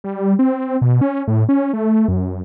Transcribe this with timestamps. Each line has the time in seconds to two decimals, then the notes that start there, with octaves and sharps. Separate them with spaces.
0.04 G3
0.39 C4
0.82 B2
1.01 C#4
1.28 A2
1.49 C#4
1.73 A3
2.08 F#2